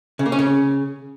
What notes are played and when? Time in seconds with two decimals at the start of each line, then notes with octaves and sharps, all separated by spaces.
0.19 C#3
0.26 A#3
0.32 C#4
0.39 C#3